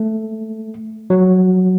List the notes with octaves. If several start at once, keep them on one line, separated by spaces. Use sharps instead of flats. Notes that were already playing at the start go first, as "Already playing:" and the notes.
Already playing: A3
F#3